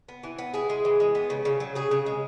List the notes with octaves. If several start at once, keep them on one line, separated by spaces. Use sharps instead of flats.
B3
E3
B3
E4 G#4
G#3
E3
G#3
B3
C#3
C#3
F#3
C#3 G#4
C#3
G#3